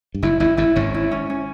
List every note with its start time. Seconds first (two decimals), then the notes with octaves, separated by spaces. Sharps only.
0.14 G2
0.22 F#1 F#2 E4
0.40 G#1 G#2 E4
0.57 G#1 G#2 E4
0.76 G#1 G#2 C#4
0.94 E4
1.11 C#4
1.30 C#4